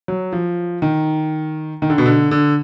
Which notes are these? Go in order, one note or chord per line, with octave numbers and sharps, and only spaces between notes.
F#3
F3
D#3
D#3
D3
B2
D3
D3